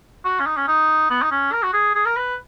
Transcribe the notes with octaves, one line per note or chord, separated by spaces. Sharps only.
F#4
C#4
D#4
C#4
D#4
B3
D#4
C#4
A#4
F#4
G#4
G#4
A#4
B4